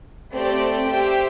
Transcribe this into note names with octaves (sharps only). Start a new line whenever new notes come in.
A3 C4 G4 D5
G4 C5 E5 G5